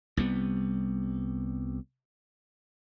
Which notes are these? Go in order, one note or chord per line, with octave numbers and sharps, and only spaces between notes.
C2 G3 B3